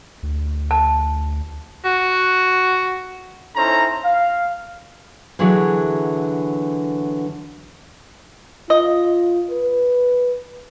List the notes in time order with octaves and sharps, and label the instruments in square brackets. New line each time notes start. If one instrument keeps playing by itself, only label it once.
[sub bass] D2
[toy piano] A5
[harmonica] F#4
[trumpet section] C#4 D#4 E4 A4 C5 A#5
F5
[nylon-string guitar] D3 E3 F#3 E4 F#4 G#4
[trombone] F4 [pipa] D#5
[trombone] B4